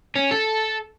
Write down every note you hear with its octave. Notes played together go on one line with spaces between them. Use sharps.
C#4
A4